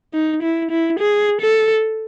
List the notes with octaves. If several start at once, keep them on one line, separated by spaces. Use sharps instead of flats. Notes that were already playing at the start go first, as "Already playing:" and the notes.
D#4
E4
E4
G#4
A4